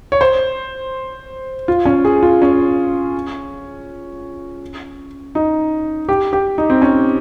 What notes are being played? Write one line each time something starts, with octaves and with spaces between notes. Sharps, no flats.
C#5
C5
F4
C#4
G#4
F4
C#4
D#4
G4
G4
D#4
C4
C#4